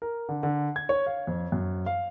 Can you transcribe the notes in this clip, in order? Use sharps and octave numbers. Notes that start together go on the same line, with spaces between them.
A#4
D3
D3
G#6
C#5
F5
F2
F#2
F5